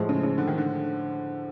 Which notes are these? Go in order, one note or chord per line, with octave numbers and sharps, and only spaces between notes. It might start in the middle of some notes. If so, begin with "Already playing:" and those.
Already playing: A2 F3 G#3
C#3
C#3
D3
D#3
D3